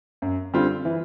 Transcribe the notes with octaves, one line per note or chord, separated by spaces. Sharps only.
F#2
D3 G3 C4 F4
E3